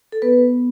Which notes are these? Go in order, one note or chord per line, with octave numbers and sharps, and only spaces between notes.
A4
B3 B4